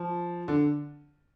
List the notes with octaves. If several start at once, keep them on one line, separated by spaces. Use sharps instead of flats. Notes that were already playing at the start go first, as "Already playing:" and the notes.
Already playing: F3
D3